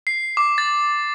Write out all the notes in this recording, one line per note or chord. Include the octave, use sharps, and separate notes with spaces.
C7
D6
A6